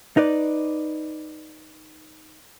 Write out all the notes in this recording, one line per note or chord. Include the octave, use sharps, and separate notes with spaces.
D#4 B4 D5